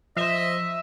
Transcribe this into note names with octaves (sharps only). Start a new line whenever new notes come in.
F3 C5 D#5 E5